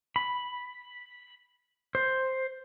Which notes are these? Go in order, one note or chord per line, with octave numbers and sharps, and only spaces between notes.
B5
C5